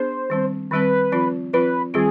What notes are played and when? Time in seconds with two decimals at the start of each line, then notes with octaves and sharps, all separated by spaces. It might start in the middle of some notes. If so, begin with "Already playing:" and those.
Already playing: B3 D4 G#4 C5
0.30 D#3 G3 C4
0.71 D#3 G3 C4 B4
1.12 F3 C4 F4
1.53 F3 C4 F4 B4
1.94 D#3 G3 C4 F4 G#4